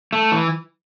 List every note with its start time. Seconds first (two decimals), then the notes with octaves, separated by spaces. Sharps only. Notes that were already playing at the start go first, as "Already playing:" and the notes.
0.13 A3
0.32 E3